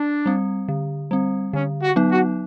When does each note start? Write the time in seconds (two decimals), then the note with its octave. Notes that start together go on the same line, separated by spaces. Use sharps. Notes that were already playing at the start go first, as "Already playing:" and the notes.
Already playing: D4
0.26 G3 C4
0.69 D3
1.11 G3 C4
1.53 D3 C#4
1.82 F#4
1.96 F#3 B3 D#4
2.10 F#4